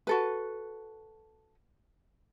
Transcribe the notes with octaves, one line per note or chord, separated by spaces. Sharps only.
F#4 A4 B4